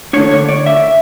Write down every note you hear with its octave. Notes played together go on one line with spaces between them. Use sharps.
D3 A3 D4 C#5
C#5
D5
E5